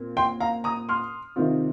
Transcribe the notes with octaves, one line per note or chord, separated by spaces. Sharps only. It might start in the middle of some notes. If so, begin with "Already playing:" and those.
Already playing: A#2 C4
G5 C6
F5 A#5
A#5 D#6
C6 F6
C3 D#3 C4 F4